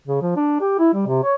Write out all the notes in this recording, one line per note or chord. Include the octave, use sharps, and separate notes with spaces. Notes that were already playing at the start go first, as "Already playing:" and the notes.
C#3
F3
D4
G4
E4
G3
C3
C#5